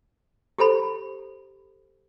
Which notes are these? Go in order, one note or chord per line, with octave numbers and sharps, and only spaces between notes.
G4 A4 C5 B5